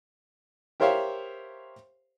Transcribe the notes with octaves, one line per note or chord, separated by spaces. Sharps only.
G4 A#4 C5 C#5 E5 F5